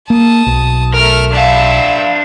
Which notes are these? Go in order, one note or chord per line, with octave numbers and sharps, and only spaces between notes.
A#3 A5 D#6
B1
A3 A#4 F6
D4 E5 F5 A5